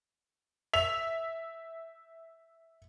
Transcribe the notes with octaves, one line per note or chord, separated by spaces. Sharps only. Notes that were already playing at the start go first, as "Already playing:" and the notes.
E5 F7